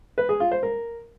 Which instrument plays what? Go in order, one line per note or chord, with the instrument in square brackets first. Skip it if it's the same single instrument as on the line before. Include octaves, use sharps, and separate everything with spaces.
[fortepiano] B4
G#4
F4
C5
A#4